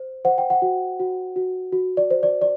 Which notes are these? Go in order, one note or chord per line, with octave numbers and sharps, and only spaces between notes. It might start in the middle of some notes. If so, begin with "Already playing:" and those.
Already playing: C5
C5 F#5
G5
F#5
F#4
F#4
F#4
F#4
D5
C5
D5
D5